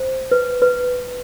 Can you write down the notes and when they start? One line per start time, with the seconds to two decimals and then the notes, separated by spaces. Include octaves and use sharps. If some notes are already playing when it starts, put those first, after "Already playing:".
Already playing: C5
0.31 B4
0.62 B4